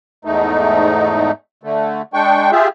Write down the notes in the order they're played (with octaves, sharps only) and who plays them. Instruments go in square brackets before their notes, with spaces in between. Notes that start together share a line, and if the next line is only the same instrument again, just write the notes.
[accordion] E2 G#2 A3 D#4
D3 A3
G#3 D4 G5 C#6
F4 G4 G#4 E5